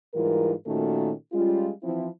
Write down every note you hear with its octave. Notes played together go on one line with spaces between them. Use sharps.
G#2 E3 G3 F4 A#4
A#2 D#3 A3 C#4 F#4 A4
G3 G#3 C#4 F4
E3 F3 C4 E4